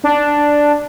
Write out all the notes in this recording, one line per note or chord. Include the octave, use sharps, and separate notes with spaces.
D4